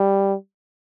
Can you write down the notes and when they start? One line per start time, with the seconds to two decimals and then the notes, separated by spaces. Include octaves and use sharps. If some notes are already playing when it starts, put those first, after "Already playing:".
Already playing: G3